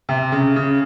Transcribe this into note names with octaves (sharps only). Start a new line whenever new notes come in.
C3
C#3
C#3